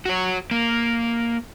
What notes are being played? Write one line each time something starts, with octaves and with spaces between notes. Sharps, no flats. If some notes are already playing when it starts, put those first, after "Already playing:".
F#4 C#5
A#3